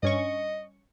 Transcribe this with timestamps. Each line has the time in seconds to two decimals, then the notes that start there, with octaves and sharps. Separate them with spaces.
0.03 G2 C#4 D#5 C#6